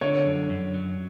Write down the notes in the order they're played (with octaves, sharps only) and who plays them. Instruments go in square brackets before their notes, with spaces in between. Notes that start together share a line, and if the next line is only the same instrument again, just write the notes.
[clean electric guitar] D3 [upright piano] C#5
[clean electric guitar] F#2
F#2
F#3